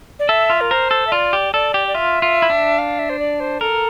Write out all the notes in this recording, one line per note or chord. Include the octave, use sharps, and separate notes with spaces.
D5
A4 E5
F4
A#4
A#4 C5
A4
E5
F4 D5
G4
A4 D5
G4
D5
F4 E5
F4
E4
D4
F5
E5
C5
D5
C5
A4 A#4